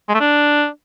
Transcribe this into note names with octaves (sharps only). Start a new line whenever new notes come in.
G#3
A3
D4